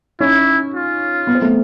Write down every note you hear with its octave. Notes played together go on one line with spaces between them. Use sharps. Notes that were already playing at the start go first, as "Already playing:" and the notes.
C#4 D#4 E4
F4
B3
C4
A3 B3